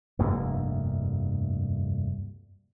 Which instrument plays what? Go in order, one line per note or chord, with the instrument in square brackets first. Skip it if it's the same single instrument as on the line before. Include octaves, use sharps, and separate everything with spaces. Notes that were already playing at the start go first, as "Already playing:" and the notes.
[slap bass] F1 D2 G2 A#3